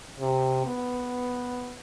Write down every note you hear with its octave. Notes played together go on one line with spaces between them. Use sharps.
C3
B3